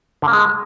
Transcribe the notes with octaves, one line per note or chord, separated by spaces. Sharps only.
D3
A#3
G#3